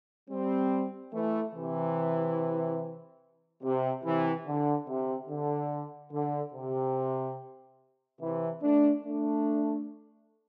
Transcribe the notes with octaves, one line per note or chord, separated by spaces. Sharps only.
G3 C4
E3 A3
C3 E3
C3
C3 E3
D3
C3
D3
D3
C3
C3 E3
A3 D4
A3 D4